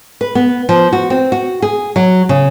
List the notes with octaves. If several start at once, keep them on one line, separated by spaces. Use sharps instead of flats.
B4
B3
F3
F#4
C4
F#4
G#4
F#3
C#3